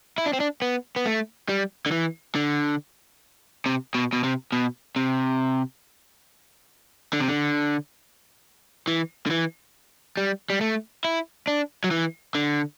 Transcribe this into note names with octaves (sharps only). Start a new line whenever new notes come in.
E4
D4
C4
D4
B3
B3
A3
G3
D3
E3
D3
C3
B2
B2
C3
B2
C3
D3
C3
D3
E3
D3
E3
G3
G3
A3
E4
D4
F#3
E3
D3